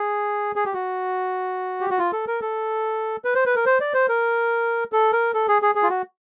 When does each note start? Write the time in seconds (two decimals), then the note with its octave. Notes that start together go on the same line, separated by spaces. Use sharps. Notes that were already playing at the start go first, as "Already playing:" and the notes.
Already playing: G#4
0.56 G#4
0.65 G4
0.73 F#4
1.81 G4
1.90 F#4
1.99 F4
2.12 A4
2.27 A#4
2.41 A4
3.25 B4
3.35 C5
3.46 B4
3.56 A#4
3.66 C5
3.81 D5
3.94 C5
4.09 A#4
4.93 A4
5.13 A#4
5.34 A4
5.48 G#4
5.62 G#4
5.75 G#4
5.83 F4
5.90 F#4